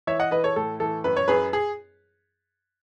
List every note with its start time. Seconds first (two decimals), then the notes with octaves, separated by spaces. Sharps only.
0.07 E3 C#5 E5
0.20 D#5 F#5
0.31 E3 B4 D#5
0.44 A4 C#5
0.56 A2 A4
0.80 E3 A4
1.04 F#2 B4
1.17 C#5
1.28 F#2 G#4 B4
1.53 G#4